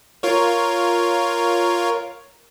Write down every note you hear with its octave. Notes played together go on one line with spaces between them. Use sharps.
F4 A#4 C#5